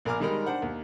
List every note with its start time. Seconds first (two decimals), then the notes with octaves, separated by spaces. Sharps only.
0.05 A#1 A#4 G#5 A#5 D6 F6
0.20 D#3 G3 G#3 D#4 A#4 B5
0.46 D4 C5 F#5
0.62 D#2